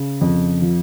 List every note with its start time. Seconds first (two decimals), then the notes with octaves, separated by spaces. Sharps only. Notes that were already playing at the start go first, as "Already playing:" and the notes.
Already playing: C#3
0.21 F2
0.61 F3